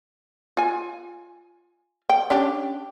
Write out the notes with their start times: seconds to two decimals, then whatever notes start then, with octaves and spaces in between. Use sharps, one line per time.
0.57 F4 G#5
2.09 G5
2.30 C#4 D4 G4